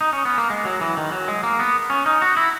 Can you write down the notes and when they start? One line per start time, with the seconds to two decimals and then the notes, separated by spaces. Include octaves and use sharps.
0.01 D#4
0.13 C#4
0.25 B3
0.38 A#3
0.50 G#3
0.65 F#3
0.81 E3
0.97 D#3
1.12 F#3
1.28 G#3
1.43 A#3
1.59 B3
1.90 C#4
2.06 D#4
2.22 F#4
2.37 E4